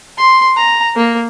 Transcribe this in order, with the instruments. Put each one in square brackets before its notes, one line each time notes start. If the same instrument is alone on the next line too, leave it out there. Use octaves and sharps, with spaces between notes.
[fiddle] C6
A#5
A#3